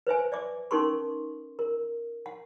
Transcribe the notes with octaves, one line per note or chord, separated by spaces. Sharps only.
B4 C5 E5 G#5
D5 E5 D6
C#4 D#4 A4 A#4 C6 C#6
A#4
F#5